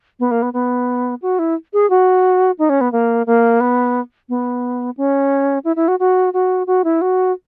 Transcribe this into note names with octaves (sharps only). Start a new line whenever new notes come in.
B3
A#3
B3
B3
F#4
E4
G#4
F#4
D#4
C#4
B3
A#3
A#3
B3
B3
C#4
E4
E4
F#4
F#4
F#4
F#4
E4
F#4